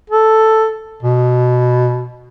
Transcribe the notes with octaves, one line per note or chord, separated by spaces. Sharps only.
A4
B2